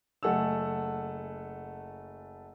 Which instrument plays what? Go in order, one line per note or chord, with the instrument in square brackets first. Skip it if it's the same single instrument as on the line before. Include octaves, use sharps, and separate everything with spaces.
[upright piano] F#1 A3 A4 F#5 G#5 E6